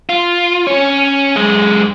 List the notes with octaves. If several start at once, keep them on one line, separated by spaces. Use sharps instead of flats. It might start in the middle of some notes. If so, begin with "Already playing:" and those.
F4
C#4 C#5
F#2 G#3